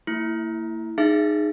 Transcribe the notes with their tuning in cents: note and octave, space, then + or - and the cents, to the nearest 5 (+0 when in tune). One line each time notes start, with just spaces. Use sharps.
A#3 -40 E4 +0
D#4 -20 G#4 +0 E5 +30